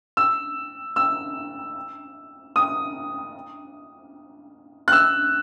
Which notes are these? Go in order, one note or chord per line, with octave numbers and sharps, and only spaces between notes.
E6
E6
D#6
F#6
E6